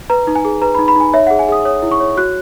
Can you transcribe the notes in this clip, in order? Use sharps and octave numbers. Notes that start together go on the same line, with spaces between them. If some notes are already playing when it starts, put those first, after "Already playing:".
B4 A#5
D#4
G#5
G#4
B4 A#5
D#4 B5
B5
D#4 G#5
C#5 E5
G#4 F#5
G#5
G#4 D#6
C#5 D#6
E4
C#6
C#5
F#4 F#6